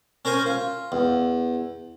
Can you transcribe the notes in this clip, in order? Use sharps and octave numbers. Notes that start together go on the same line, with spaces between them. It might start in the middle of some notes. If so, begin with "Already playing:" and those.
C#4 A#4 C5 G#5
F4
E2